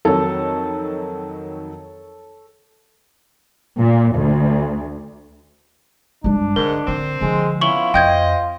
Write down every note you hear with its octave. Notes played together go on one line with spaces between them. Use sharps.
F2 D#3 F#3 A4 C#5
A#2
D2
G2 G#3 D4
G#2 D3 A#4
D3 D#3 C4
D3 F3 G#3
B3 C#4 E4 F4 C#6 F#7 G7
F2 C5 D#5 G5 G6 G#6